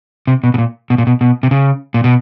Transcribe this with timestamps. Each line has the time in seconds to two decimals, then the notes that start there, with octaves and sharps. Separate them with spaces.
0.27 C3
0.44 B2
0.54 B2
0.58 A#2
0.90 B2
0.98 A#2
1.07 B2
1.21 B2
1.43 C3
1.51 C#3
1.94 A#2
2.04 B2